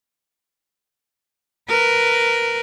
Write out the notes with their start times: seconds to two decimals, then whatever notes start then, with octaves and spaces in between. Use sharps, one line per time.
1.68 A#4 B4